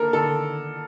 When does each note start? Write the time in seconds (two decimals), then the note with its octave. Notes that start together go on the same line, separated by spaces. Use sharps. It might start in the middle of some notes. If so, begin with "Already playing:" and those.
Already playing: D3 A#3 A4 A#4
0.13 D3 A4